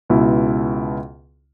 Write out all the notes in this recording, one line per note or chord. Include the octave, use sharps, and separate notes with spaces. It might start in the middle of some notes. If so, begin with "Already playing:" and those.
C#2 B2 E4